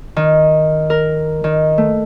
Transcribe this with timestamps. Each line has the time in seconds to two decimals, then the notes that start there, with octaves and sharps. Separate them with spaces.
0.16 D#3
0.90 A#4
1.44 D#3
1.78 A3